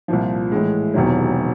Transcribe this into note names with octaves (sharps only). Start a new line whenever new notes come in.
C2 A#2 F3
A2 E3 G#3
E1 E2 C3 D#3 F#3